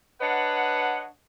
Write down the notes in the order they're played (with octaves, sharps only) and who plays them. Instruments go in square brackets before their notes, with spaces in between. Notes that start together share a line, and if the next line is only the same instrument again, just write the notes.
[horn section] D4 B4 C#5 D#5 F#5